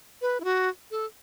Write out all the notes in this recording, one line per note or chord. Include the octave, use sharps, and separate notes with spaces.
B4
E4
F#4
A4